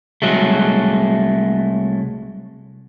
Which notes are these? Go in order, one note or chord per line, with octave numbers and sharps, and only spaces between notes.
C2 F#3 G#3 A3